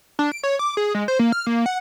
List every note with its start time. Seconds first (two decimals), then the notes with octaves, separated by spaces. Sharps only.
0.19 D4
0.32 D7
0.43 C#5
0.59 D6
0.77 G#4
0.95 G#3
1.08 C5
1.19 A#3
1.32 F6
1.47 A#3
1.66 F#5